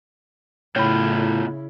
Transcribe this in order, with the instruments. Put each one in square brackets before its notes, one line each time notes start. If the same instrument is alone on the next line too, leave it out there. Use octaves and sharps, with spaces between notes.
[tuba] A2 [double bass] C#3 E4 [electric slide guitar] B3 F4 G5 [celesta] C#5 B5